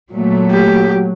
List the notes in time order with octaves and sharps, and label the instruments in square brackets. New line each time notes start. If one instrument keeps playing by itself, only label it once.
[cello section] A#2 A3 [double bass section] F#3
[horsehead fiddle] G4